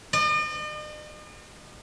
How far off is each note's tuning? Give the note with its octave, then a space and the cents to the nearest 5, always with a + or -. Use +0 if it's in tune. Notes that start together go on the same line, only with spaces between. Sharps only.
D#5 -45